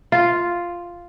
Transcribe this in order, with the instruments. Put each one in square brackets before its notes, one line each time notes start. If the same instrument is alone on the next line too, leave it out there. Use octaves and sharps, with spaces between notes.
[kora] F4